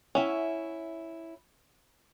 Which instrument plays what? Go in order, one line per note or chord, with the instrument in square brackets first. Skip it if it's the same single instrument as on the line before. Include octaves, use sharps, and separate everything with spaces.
[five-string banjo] C#4 E5 [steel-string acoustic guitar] E4 F#5